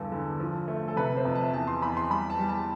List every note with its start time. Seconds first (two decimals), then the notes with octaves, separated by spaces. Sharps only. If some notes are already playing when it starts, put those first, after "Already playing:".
Already playing: E2 G2 D3 A4
0.12 D3
0.40 F3
0.68 A3
0.88 A4
0.96 C3 B4
1.16 C5
1.25 F2
1.35 A5
1.53 E2 A5
1.67 C6
1.82 E2 B5
1.97 C6
2.10 G3 B5
2.30 A5
2.39 G3
2.49 A5